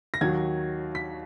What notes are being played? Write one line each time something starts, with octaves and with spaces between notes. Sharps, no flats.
A#6
D#2 D#3 F#3 G#6
B6